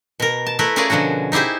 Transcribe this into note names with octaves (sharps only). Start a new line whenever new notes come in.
B2 A#4
A5
A3 E4 A#4 B4
C#4 E4 F4 G#4 A#4 D5
B2 D3 F3 C#4 F#4
D#4 E4 G4 G#4 C5